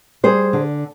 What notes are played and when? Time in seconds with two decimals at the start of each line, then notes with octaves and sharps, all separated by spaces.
0.23 G3 G#4 C5
0.53 D3